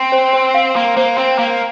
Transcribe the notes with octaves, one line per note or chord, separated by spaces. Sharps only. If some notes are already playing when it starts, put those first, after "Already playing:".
Already playing: C4 C6
C5
C5
F5
A#3 C6
A#3 C5
C4 C5
A#3 F5